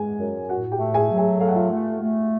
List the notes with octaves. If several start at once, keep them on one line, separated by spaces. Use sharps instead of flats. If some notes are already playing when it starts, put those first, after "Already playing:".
Already playing: G#3 G#4 G#5
F#2
A2 F#4 F#5
G4 G5
A3
G#4 G#5
F#3
G#4 G#5
A3 F5
F#5
F4 F5
A3
A3